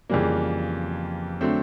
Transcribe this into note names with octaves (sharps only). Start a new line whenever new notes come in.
F2 C#3 E3 G3 A#3
D3 F#3 A3 C4